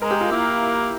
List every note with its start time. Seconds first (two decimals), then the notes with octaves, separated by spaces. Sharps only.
0.02 G#3 A#4
0.11 G4
0.21 F4
0.31 A#3 E4